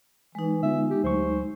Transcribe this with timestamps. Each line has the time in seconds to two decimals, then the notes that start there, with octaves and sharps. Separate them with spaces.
0.35 E3 G#3 D#4
0.63 D3 B3 F4 E5
0.90 G4
1.04 D2 F#3 C5 C#6